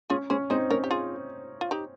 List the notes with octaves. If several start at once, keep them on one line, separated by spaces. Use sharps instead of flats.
C#4 F4 G#4
C#4 G#4 C5
C4 D#4 G#4 C5
C#4 A#4 C#5
G4
F4 G#4
F4
D#4 G4